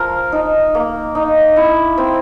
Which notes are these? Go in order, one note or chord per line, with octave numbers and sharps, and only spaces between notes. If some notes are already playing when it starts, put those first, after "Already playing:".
Already playing: F3 A#4
D#4
A#3
D#4
E4
C4